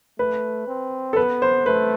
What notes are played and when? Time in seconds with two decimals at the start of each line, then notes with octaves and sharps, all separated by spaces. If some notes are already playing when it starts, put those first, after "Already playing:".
0.19 A3 B4
0.68 C4
1.13 A4
1.16 B3 B4
1.42 C5
1.66 A3 B4